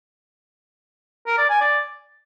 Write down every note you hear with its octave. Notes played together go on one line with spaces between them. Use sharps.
A#4
D5
G#5
D5